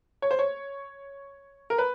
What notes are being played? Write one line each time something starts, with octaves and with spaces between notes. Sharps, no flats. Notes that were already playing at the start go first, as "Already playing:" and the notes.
C#5
C5
C#5
A#4
B4